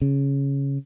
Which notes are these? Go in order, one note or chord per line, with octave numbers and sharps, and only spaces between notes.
C#3